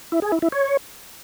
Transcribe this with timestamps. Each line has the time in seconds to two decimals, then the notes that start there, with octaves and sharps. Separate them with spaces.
0.12 E4
0.22 G#4
0.32 E4
0.42 E4
0.52 C#5